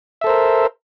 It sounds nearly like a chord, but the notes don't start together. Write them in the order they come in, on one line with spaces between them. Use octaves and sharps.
E5 A4 C5 A#4